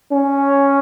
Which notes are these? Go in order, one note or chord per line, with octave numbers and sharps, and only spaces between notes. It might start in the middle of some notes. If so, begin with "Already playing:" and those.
C#4